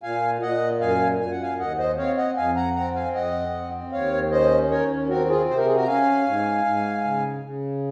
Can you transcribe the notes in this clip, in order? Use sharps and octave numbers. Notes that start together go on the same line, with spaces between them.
A#2 F5 G#5
A#2 D#5 F#5
F#2 F5 G#5
F#2 G#5
F#5
F5 G#5
D#2 D#5 F#5
C5 D#5
C4 C#5 F5
D#5 F#5
F2 F5 G#5
F#5 A#5
C4 F#5 A#5
F5 G#5
F2 D#5 F#5
C4
D#2 C#5 F5
C#4 C5 D#5
D#2 A#4 C#5
C4 F#4 A#4
F4 G#4
C3 C5
A#4
G#4
F#4 A#4
A#5
C#4 F5 G#5
G#2
G#2
C#3
C#3